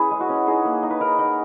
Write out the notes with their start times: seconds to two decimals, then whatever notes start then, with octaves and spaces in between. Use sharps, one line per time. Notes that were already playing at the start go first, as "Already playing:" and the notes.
Already playing: C#4 E4 G#4 B4
0.11 G#3
0.20 F#4
0.29 C#4
0.47 D#4 G#4
0.65 A#3
0.83 D#4
0.90 B4
1.01 D#4 A#4
1.19 D#4